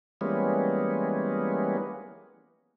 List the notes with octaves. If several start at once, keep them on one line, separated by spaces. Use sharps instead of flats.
E3 G3 G#3 A#3 B3 C#4